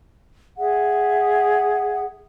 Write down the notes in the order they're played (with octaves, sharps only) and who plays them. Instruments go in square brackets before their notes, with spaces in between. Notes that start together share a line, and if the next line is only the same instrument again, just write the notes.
[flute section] G#4 E5 F#5